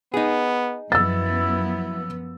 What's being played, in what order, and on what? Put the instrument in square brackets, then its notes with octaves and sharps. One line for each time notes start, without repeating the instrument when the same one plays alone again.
[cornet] B3 [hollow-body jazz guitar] D#4 G#4
[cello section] F#2 F3 B3 [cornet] E4 [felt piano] E6 A6